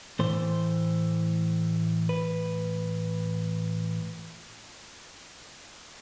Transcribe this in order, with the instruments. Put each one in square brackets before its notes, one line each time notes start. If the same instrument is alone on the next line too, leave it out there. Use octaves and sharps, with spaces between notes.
[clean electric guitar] A2 E3 A3 C5
B4